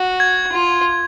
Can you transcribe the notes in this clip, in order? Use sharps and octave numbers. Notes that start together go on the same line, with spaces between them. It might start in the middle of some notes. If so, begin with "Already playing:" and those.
Already playing: F#4
G#6
F4